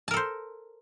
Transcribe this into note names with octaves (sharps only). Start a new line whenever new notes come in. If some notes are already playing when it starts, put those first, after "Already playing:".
A4 A#4 C5 A5